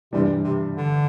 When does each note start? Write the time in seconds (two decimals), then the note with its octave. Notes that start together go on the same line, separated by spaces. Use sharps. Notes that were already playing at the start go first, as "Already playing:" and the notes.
0.13 G2 C3 E3 G3 D4
0.44 C3
0.77 D3